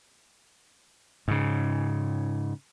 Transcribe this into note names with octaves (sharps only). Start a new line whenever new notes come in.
G#2 C#3